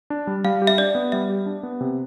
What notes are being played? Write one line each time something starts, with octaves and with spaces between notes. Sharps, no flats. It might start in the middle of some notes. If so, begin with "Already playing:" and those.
D4
G3
G3 F5
G4
E5
D4 D5
B3
G3 E5
G4
D4
B3
C3